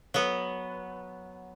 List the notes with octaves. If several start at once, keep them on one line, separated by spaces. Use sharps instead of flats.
F#3 B3